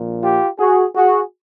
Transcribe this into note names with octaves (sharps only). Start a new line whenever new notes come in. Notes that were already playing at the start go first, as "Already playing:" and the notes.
Already playing: A#1 A#2 F3
F4 G4
F#4 G#4
F#4 G#4